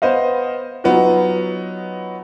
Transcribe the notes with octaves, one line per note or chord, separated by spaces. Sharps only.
B3 C5 D#5 F5
F#3 B3 D#4 F4 F#4